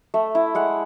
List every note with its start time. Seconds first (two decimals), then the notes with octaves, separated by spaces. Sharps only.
0.14 A3 E5
0.35 E4
0.55 G#3 F#5